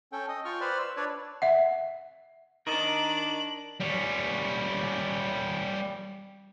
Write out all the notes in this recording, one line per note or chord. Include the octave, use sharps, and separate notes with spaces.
C#4 A4 G5
D#5 D#6
F4 G5 C#6 F6
B4 C5 D5 B5 F6
E6
D4 B4 C#5 D5
E5 F#5
D#3 D4 A#4 D#5 A5 D6 F#7
G3 C#4